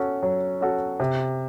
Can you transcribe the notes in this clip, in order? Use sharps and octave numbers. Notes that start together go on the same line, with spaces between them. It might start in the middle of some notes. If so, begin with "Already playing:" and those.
Already playing: C#4 F#4 A4
F#3
C#4 F#4 A4
C3